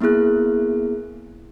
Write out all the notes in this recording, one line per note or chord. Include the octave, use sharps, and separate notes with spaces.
A#3 B3 E4 G#4 F#6